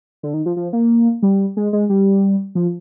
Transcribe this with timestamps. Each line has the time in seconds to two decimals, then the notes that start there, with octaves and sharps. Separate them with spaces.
0.23 D3
0.34 D#3
0.46 F3
0.57 F3
0.73 A#3
1.23 G3
1.57 G#3
1.73 G#3
1.89 G3
2.55 F3